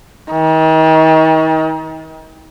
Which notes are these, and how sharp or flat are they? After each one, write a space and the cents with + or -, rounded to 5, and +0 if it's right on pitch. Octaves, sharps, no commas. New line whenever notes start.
D#3 +40